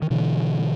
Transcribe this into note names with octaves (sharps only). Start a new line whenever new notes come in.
D#3
B2 D3 E3